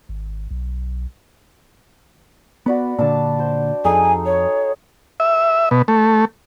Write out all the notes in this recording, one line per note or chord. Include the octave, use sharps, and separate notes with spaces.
G#1
B1
B3 F#4 D5 B5
A#2 D3 D4 D5 A5
C5 D6
F2 D#4 G#4 A4 G#5
C#5
E5
B2
A3